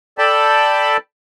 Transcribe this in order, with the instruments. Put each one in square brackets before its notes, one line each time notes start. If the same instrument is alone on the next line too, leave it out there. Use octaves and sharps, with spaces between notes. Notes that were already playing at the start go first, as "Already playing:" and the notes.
[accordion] A4 D5 G5 A5 B5